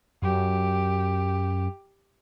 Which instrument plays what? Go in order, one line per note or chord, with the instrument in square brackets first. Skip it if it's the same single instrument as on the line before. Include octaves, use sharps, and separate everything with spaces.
[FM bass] F#2 [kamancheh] G4